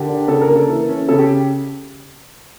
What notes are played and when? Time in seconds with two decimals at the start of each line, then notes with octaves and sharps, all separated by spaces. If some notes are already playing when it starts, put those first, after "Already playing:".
Already playing: D3 G4 A#4
0.08 D4
0.28 C#3 A4
0.41 A#4
0.48 A#3
0.56 A4
0.68 E3
0.89 C#4
1.08 C#3 A4
1.19 G4